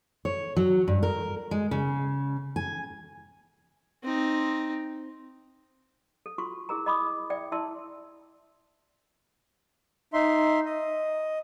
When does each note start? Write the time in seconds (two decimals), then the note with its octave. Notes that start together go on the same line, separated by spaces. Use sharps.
0.25 C#5
0.56 F#3
0.88 G2
1.03 A#4
1.51 G#3
1.71 C#3
2.56 G#5
4.03 C4 D#4
6.26 A4
6.38 F4 F#4 C6 C#6
6.69 E4 G#4 A#4 A#5
6.86 D#5 B5 D6 D#6
7.30 D5 E5 G5
7.52 E4 D5 E5 A5 C6 E6
10.13 D#4 E5 C6
10.65 D#5